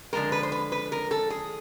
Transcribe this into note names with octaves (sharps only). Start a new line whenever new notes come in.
D3 F3 G#3 A#4
B4
C5
B4
B4
A#4
A4
G#4